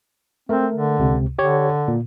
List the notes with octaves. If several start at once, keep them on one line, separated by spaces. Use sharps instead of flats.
A3 C4 A#4
D3
C#2 C3
D3 G4 C#5
A#2